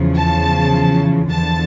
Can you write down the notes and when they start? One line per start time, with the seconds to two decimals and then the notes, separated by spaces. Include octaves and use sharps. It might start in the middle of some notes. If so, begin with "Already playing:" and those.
Already playing: E2 C#3 F3
0.17 A5
1.30 E2 D3 F3 A5